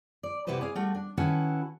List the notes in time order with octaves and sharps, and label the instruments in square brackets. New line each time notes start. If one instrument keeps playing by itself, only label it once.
[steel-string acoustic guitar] D5
C3 E4 F#4 G4 B4 C5
G#4 D5 F5
G3 A3 F#4
D4
D#3 C#4 E4 F#4 A4 B4